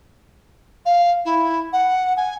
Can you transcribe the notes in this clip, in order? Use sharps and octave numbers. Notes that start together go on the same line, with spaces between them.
F5
E4
F#5
G#5